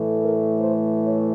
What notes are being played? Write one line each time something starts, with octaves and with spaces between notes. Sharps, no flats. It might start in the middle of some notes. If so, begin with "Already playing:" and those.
Already playing: A2 E3 A3
A#4
C5
C#5